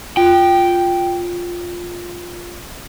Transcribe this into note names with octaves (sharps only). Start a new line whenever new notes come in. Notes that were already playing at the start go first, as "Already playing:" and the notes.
F4 G5